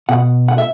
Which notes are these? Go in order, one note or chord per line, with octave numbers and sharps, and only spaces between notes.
B2 F#5
F#5
E5